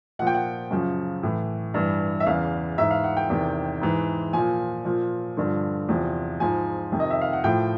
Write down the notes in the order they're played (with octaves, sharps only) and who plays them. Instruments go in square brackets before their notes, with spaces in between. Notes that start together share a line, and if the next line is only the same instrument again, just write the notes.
[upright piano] A#2 F3 F#5
G5
F#5
F#2 C#3 F3
A2 E3
G2 E3
E5
E2 C#3 E3 F5
G#2 E3 E5
F5
F#5
G5
E2 C3 D#3
G#2 E3
A#2 F3 G#5
A#2 F3
G2 D3 F3
E2 C3 F3
G#2 F3 G#5
F2 C3 D#3
D#5
E5
F5
F#5
A2 F3 G5